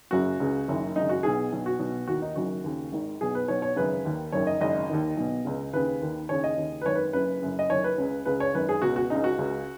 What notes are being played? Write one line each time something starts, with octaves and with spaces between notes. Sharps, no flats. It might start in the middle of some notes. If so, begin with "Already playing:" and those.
F#1 F#2 C#3 F#4
C#2 C#3
F#1 F#2 D#3
G#1 F#2 C#3 D#4
F#4
B1 B2 G#4
B1 B2
F#4
B1 B2
D#2 D#3 F#4
D#4
F#1 F#2 D#3 F#4
D#2 C#3
G#1 G#2 D#3
B1 B2 G#4
B4
B1 B2 C#5
C#5
G#1 F#2 C#3 B4
D#2 D#3
F#1 F#2 D#3 C#5
D#5
G#1 F#2 C#3 D#5
D#2 D#3
B1 B2
C#2 C#3
D#2 C#3 B4
D#2 D#3
D#2 C#3 C#5
D#5
D#2 C#3
B4
G#1 F#2 D#3 C#5
B4
F#1 F#2 C#3 B4
F#1 F#2 C#3
D#5
F#1 F#2 D#3 C#5
B4
C#2 C#3
C#2 C#3 B4
C#5
G#1 F#2 D#3 B4
G#4
C#2 B2 F#4
F#4
C#2 C#3 D#4
F#4
C#2 C#3